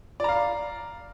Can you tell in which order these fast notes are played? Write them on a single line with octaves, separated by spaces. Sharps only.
D5 A#5 F5